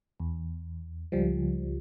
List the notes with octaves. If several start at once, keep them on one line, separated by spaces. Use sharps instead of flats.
E2
C#2 F3 G3